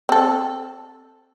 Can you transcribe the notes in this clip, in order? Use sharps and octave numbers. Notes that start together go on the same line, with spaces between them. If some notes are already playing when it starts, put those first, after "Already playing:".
C4 A4